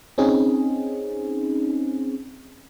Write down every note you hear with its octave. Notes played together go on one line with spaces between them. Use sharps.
C4 C#4 D#4 G#4